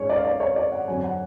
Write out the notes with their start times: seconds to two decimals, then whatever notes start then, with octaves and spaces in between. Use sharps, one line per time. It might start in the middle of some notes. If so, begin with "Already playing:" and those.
Already playing: G#2 G#3 C#4 C#5
0.09 D5
0.17 F5
0.25 D5
0.40 C#5
0.56 D5
0.72 F#5
0.88 F2 D3 F#3 G#5
1.04 F#5